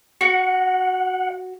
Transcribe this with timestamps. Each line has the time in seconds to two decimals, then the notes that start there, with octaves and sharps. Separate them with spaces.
0.21 F#4 F#5